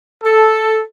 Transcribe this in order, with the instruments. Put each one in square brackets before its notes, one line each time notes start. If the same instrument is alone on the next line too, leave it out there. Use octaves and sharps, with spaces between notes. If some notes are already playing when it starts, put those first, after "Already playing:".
[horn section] A4